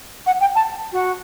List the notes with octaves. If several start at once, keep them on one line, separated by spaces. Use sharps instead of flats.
F#5
G5
A5
F#4